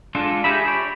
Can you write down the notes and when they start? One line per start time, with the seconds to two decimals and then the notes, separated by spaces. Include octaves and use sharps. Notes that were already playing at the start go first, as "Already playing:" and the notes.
0.15 G#3 D4 F4 A4
0.44 D#4 G4 G#4 E5 B5
0.68 C#5 D5 B5